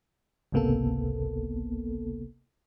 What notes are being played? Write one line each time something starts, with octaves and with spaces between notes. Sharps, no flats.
G#1 C#2 C3 A#3 B3 A4